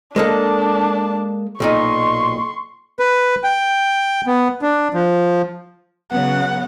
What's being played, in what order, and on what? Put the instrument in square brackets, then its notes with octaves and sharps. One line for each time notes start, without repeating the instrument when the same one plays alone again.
[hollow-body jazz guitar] G#3 A#3 A4 [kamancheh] D4 A5
[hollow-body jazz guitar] B1 A#2 D#4 [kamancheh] C6 C#6
[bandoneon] B4
G5
B3
D4
F3
[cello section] C#3 F#3 B3 [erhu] F#5